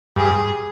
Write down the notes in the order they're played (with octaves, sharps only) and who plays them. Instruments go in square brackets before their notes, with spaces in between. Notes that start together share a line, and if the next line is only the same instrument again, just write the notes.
[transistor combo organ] G2 [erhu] G#4